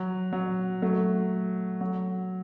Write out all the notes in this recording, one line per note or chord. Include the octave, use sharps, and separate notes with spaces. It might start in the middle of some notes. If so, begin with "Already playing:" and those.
Already playing: F#3
F#3
F#3 A3
F#3